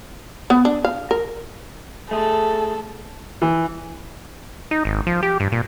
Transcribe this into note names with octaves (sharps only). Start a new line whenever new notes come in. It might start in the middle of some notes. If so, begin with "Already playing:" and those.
B3
D4
F5
A#4
A3 G#4 A4
E3
D#4
G#1
F3
G4
G2
A#2